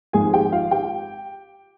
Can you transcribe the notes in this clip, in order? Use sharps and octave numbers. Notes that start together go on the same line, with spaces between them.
G#1 G#2 F3 G#3 G#4 G#5
G4 G5
F4 F5
G4 G5